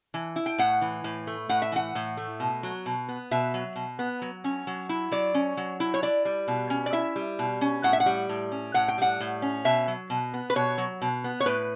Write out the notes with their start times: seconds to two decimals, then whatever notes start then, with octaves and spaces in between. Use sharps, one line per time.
0.14 E3
0.36 E4
0.46 G5
0.58 A2 F#5
0.81 E3
1.04 A2
1.27 A3
1.49 A2 F#5
1.62 E5
1.72 E3 F#5
1.95 A2
2.17 A3
2.40 B2
2.63 F#3
2.86 B2
3.09 B3
3.31 B2 E5
3.54 F#3
3.76 B2
3.99 B3
4.22 F#3
4.44 C#4
4.67 F#3
4.89 E4
5.11 F#3 D5
5.34 C#4
5.57 F#3
5.80 E4
5.94 C#5
6.02 E4 D5
6.25 G3
6.48 B2
6.70 C#4
6.86 D5
6.93 E4 E5
7.16 G3
7.39 B2
7.61 C#4
7.83 A2 F#5
7.93 E5
8.00 F#5
8.06 G3
8.29 A2
8.51 C#4
8.74 A2 F#5
8.88 G5
8.98 G3 F#5
9.20 A2
9.42 C#4
9.65 B2 E5
9.88 F#3
10.10 B2
10.34 B3
10.50 B4
10.56 B2 C#5
10.78 F#3
11.02 B2
11.24 B3
11.40 C#5
11.46 A2 B4